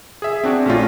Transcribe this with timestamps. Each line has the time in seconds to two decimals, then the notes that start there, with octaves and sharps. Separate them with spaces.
0.22 G#4 E5
0.44 C4 D4 F#4 G#4
0.66 A#1 A3 C#4 F4